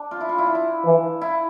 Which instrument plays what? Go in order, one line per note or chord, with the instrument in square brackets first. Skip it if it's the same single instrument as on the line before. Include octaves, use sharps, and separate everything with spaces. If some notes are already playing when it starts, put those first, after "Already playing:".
Already playing: [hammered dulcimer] D4
F4
E4
F4
E4
F4
E4
[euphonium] E3
[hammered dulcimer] E4